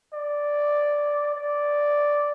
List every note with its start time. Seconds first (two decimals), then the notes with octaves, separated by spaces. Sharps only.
0.13 D5
1.35 D5